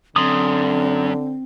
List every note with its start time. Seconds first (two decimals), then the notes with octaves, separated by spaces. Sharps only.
0.16 F#2 D3 C4 C6 D#6